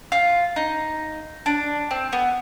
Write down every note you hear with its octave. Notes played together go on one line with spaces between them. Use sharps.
F4
D#4
D4
C4
B3